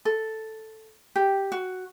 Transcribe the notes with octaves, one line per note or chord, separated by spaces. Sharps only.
A4
G4
F#4